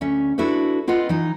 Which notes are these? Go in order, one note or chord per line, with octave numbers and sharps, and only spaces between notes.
D2 C#4 E5
D4 E4 F#4 A4 B4
C4 F4 B4 D#5 F#5
E3 D#4